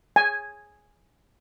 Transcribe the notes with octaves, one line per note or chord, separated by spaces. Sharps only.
G#5